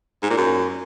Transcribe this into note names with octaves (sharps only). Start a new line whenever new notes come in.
G#2
A#2
F#2